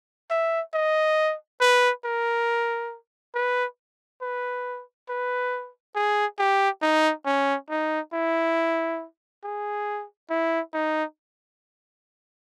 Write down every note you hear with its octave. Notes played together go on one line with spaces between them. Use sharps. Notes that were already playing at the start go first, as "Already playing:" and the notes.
E5
D#5
B4
A#4
B4
B4
B4
G#4
G4
D#4
C#4
D#4
E4
G#4
E4
D#4